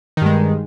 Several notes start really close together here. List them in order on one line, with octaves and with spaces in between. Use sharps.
D#3 G2 G#3